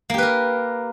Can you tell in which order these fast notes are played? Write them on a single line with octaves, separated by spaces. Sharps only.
A#3 G4 B4 A#4